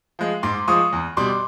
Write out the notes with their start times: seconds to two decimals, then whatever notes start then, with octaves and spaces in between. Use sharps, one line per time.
0.19 F3 G#3
0.43 G#2 C6 D6
0.68 F3 G#3 C#6 D#6
0.92 E2
1.17 B2 G3 C6 D6